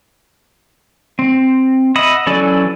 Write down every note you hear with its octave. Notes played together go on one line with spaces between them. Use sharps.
C4
D#5 E5 F#5 B5 D#6
E3 F#3 C#4 A4 D5